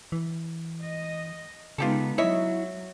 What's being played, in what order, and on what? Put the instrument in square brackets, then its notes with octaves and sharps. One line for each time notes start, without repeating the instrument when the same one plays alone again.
[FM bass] E3
[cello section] D#5
[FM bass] C#3 [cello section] G#3 B3 D#4 [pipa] F4 G4 A4
[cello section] F#3 [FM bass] E4 [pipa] C#5 D#5 E5